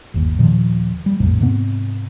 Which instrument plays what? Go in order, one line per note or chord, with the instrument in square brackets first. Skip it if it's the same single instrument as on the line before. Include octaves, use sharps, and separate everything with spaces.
[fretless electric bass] G1 D#2
D#1 A#2 D#3 F3
G3
A#1 F2 A2 C3
G#2 C3 B3 C4